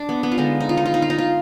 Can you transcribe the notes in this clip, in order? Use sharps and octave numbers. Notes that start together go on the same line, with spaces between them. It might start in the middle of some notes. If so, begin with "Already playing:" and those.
Already playing: D4
B3
B3
F4
D3 G#3 B3 D#4
D#4
F4
D#4
F4
D#4
F4
D#4
F4